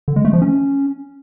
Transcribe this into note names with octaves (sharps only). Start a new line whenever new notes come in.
D3
G#3
A3
F3
C#4